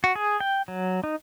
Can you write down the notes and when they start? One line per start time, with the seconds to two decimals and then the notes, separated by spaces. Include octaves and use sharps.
0.04 F#4
0.15 G#4
0.40 G5
0.68 F#3
1.04 D#4